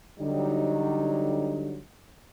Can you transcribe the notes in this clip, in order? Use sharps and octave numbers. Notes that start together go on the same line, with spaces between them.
D3 F#3 G3 D#4